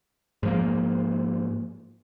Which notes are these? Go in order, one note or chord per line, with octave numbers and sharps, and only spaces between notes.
G#2 F3 A#3